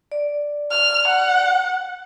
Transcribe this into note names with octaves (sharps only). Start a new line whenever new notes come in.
D5
F6
F#5